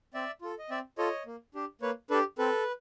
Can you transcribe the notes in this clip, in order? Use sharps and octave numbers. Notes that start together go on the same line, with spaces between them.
C4 D5 E5
F4 A4
D#5
C4 D5 E5
F4 A4 C#5 D#5
A#3
D4 G4
A#3 B4 C#5
D4 G4 A4 B4
C4 A4 B4